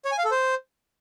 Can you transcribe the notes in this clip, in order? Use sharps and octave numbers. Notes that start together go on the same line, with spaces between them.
C#5
G#5
F5
A4
C5